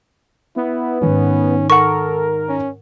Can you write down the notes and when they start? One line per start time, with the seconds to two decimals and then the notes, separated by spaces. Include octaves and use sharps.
0.56 B3 E4
1.01 G#2 D#3 C#4
1.70 A4 A#4 F#5 C#6
2.49 C#4